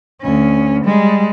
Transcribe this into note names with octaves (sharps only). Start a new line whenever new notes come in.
D2 C#4
G3 G#3